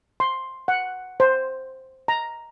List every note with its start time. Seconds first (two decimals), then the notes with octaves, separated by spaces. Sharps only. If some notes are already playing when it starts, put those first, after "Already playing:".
0.20 C6
0.68 F#5
1.20 C5
2.08 A#5